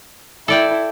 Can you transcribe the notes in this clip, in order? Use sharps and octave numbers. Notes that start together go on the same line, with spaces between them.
E4 A4 D5 G5